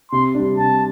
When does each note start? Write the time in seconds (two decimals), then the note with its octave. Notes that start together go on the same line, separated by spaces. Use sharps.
0.11 C3 C6
0.35 G3 D4
0.57 C3 A5